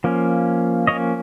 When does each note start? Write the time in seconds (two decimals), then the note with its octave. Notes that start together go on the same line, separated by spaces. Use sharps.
0.04 F3 A#3 C#4
0.87 F3 A#3 C#4 C#5 D#5